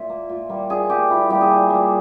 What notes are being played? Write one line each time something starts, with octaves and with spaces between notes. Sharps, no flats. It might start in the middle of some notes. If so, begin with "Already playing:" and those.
Already playing: A#2 E5
A#3
A#2
G3 A#3
A#2 G#4
G3 A#3 G4
A#2 E4
G3 A#3 G4
G#4
A#2
G3 A#3